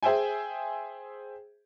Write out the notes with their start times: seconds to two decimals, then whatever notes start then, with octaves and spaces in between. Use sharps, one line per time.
0.03 G#4 C5 E5 G5 G#5